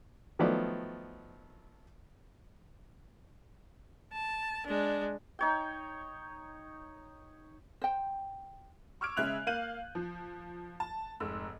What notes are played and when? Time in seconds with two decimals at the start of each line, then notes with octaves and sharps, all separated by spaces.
0.39 D#3 F3 F#3 A3 B3 D5
4.13 A5
4.66 G#3 D4
5.39 D#4 C#5 G5
7.82 C5 G5
9.01 C#6 D6 E6 F6 G#6 D7
9.17 C#3 G#3 E5 F#6 G#6 F7
9.47 A#3 F5 G6 D#7 F#7
9.95 F3
10.80 A5
11.20 F1 G#2 E6